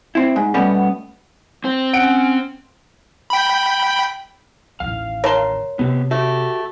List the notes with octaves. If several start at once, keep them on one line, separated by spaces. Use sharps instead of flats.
C4 E4
G#2
B2 G3 A3 B3 C#4
C4 C5
C#4 F#5 D7
G5 B5
A1 D#2 F5
A#4 C#5 A5 C6
C3 B3 G4
A3 F#4 G4